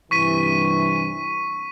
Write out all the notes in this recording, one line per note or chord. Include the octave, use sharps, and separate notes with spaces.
G2 C3 E3 C#6 B6 D#7